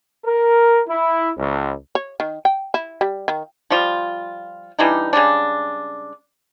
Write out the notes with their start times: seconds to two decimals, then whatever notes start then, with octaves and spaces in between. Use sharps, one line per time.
0.25 A#4
0.88 E4
1.37 C#2
1.95 C#5
2.20 D#3
2.45 G5
2.74 E4
3.01 G3
3.28 D#3
3.70 F3 G3 F4
4.79 E3 G3 D4 D#4
5.13 C#3 G3 G#3 D4